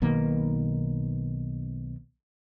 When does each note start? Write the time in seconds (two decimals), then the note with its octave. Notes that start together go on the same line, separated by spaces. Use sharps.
0.02 B1 B2 D#3 A#3